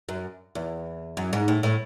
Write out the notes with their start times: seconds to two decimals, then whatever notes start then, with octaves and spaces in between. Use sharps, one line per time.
0.09 F#2
0.55 E2
1.17 F#2
1.33 G#2
1.48 A2
1.63 A2